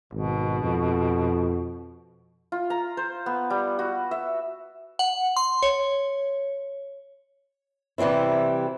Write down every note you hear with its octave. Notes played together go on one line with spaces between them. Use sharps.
G#1 B2
F2
F4
A#5
C5
B3
G3
F#4
E5
F#5
C6
C#5
C3 E3 G3 C4 E4